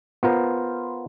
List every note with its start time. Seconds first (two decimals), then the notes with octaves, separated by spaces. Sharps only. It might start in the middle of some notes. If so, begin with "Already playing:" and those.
0.23 B3 F4 A#4 C5